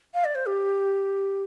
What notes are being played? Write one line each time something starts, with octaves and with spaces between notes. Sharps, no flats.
F5
D5
C5
G4